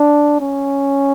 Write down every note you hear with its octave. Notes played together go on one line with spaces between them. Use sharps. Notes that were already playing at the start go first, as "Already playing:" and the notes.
Already playing: D4
C#4